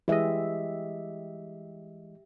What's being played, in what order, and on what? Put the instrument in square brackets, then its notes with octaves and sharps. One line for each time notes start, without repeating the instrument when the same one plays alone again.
[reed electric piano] E3 G#3 D#5 [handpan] G4 E5